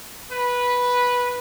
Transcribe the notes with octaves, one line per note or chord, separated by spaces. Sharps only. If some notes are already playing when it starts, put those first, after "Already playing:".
B4